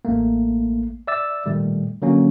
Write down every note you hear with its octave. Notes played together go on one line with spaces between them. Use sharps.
A1 A3 A#3
D5 E5 D6 E6 A6
A#2 D#3 G3 A3
D3 F#3 A#3 C#4